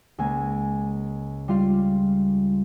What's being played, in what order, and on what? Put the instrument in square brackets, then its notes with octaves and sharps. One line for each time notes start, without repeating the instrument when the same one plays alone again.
[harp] C#2 A#3 G#5
G3 F4 F5